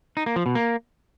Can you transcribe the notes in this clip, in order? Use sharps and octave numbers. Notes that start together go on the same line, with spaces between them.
D#4
A#3
F3
B2
A#3